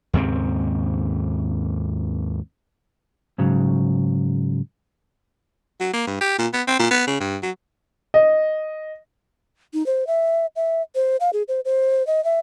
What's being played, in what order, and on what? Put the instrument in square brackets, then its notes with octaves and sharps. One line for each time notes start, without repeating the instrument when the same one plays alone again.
[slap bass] D#2 G#2 C#3 C4
[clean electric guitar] G#2 C#3 F#3
[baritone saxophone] F#3
A#3
G2
G4
A#2
B3
C4
A#2
B3
C#3
G2
F#3
[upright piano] D#5
[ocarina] D#4
C5
E5
E5
C5
F5
G#4
C5
C5
D#5
E5